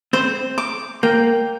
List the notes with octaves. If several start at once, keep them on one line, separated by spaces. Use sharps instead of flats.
C4 C5
D6
A#3 G5